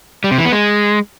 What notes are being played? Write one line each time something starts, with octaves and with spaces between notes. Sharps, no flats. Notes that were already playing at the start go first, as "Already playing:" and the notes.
G3
C3
E3
B3
G#3